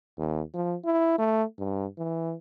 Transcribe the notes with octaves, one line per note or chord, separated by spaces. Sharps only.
D#2
F3
E4
A3
G2
E3